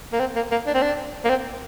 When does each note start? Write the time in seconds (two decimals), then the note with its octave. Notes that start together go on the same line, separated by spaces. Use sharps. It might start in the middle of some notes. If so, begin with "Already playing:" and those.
0.13 A#3
0.20 C4
0.35 A#3
0.51 A#3
0.67 D4
0.74 C4
0.82 D4
1.25 A#3
1.29 C4